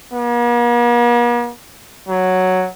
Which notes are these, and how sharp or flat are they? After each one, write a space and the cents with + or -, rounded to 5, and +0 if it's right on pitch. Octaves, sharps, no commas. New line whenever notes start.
A#3 +45
F#3 +0